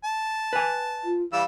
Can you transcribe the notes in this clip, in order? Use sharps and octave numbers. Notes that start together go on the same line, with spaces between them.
A5
B4 G#5
F4
E3 G3 F5 E6